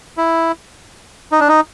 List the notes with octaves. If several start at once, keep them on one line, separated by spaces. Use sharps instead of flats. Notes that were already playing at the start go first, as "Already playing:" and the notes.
E4
D#4
D4
D#4